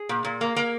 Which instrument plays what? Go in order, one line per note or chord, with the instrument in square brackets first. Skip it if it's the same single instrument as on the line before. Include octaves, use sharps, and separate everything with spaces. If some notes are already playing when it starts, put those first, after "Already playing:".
Already playing: [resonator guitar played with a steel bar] G#4
A#2
A#2
A#3
A#3